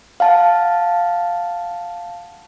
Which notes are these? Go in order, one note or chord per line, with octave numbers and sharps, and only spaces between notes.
F5 F#5 A5